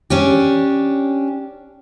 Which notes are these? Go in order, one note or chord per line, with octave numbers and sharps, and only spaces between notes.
C#4 D4 G4